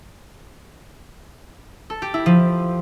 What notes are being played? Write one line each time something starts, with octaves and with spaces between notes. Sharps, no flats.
A4
G4
E4
F3